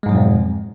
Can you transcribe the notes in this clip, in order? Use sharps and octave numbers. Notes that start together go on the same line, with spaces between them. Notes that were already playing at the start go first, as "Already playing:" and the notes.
F2 G#2 B2 F#3 G#3